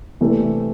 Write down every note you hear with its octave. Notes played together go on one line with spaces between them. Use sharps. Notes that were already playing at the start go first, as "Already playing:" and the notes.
C3 E3 A3 D4